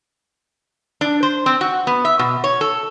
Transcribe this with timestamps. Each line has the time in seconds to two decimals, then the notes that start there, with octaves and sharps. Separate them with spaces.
1.01 D4
1.23 C5
1.46 C4
1.61 F#4
1.87 B3
2.05 E5
2.19 B2
2.44 C#5
2.61 A4